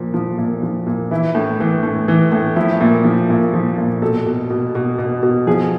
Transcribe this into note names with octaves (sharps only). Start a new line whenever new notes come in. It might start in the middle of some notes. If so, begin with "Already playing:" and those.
Already playing: A#2 F3
F3
A#2
F3
A#2
E3 E4
A2
E3
A2
E3
A2
F3 E4
A#2
F3
A#2
F3
A#2
B2 A4
B2
B2
B2
B2
B2
F3 G#4